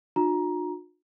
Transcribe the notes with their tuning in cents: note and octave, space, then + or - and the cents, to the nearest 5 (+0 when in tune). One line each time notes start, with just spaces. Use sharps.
D4 +45 F4 +45 A#5 +15